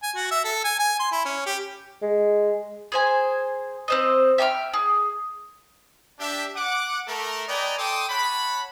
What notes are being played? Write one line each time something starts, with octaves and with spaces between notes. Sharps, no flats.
G#5
F#4
E5
A4
G#5
G#5
C6
E4
C#4
G4
G#3
G#4 C5 G#5
C4 C5 D#5
E5 G5 C#6 F6
G#4
D4 G4 E5
F#5 D6
A3 A4 A#4
B4 D5 D#5 G5 G#5 A#5
A4 G5 C6 D6 D#6
C#5 F#5 A5 B5